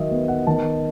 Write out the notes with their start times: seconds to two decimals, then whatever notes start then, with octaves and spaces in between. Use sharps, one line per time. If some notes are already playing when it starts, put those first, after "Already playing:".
Already playing: D#3 F#3 D#5 E5
0.11 B3
0.28 F#5
0.47 D#3 A5